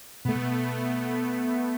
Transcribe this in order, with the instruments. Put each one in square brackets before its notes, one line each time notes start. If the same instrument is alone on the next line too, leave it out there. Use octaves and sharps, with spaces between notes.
[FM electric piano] B2 [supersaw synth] A3 B3